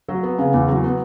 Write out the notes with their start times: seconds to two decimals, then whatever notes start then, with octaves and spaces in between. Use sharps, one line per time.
0.08 F#3
0.23 B3
0.39 C#3
0.53 E2
0.68 F#3
0.84 B3